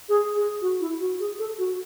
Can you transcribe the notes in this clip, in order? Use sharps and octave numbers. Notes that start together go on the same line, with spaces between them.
G#4
G#4
F#4
E4
F#4
G#4
A4
F#4